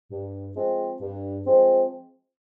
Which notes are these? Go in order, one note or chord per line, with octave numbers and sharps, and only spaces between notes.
G2
F3 G#3 C4
G2
F3 G#3 C4